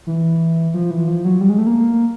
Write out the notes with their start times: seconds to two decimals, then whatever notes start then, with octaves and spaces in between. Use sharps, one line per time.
0.07 E3
0.74 F3
0.91 E3
1.08 F3
1.24 F#3
1.41 G3
1.49 G#3
1.58 A3
1.66 A#3